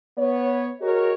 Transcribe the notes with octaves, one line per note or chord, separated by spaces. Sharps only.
B3 C#5
F#4 G#4 A#4 C#5 D#5